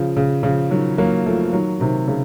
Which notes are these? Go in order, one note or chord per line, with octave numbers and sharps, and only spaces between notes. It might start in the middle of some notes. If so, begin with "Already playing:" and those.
Already playing: C#3 F3
C#3
C#3 F3
D#3 F#3
F#3 A#3
F3 A3
D#3 F#3
C3 D#3
C#3